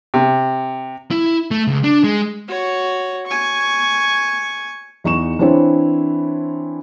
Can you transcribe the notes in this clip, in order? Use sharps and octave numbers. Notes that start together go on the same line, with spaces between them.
C3
E4
A3
C#2
D4
G#3
F#4 C#5
G#5 C#6
E2 D#4 C#6 E7
E3 C4 D4 E4 C5 C#5